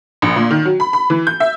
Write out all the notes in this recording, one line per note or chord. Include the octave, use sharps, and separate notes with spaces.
A#1
A#2
D#3
F#3
B5
B5
E3
G6
E5